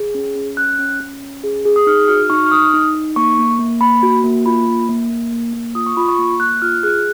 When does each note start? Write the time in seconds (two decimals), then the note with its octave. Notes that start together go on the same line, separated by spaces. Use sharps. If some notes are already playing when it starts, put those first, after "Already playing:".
Already playing: G#4
0.15 C#4
0.35 C#4
0.57 C#4 F#6
0.79 C#4
1.00 C#4
1.22 C#4
1.44 G#4
1.65 G#4
1.76 D#6
1.87 D#4 F6
2.08 F#4 F6
2.30 D#4 C#6
2.46 F6
2.51 D#4 D#6
2.73 D#4
2.95 D#4
3.16 A#3 C#6
3.38 A#3
3.59 A#3
3.80 A#3 B5
4.03 F#4
4.24 A#3
4.46 F4 B5
4.68 A#3
4.89 A#3
5.10 A#3
5.32 A#3
5.53 A#3
5.75 F4 D#6
5.86 C#6
5.97 F4 B5
6.09 C#6
6.18 A#3
6.39 A#3 F#6
6.62 F4 F6
6.83 G#4 F#6